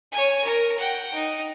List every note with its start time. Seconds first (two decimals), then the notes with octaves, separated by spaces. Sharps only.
0.12 C#5 G#5
0.44 A#4
0.78 F#5 G5
1.14 D#4